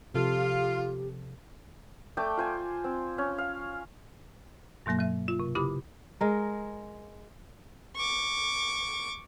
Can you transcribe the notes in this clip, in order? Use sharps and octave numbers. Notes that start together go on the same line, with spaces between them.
C3 F3 F4 G4 A4
A3 D5 G5 D6
F4 C5 G#5
C4
C#4
F5
G2 B2 F#3 A#3 A#6
F#3 E5
F4
C3
C#3 E4 G4 B5 D#6
G#3 A#4
C#6 D6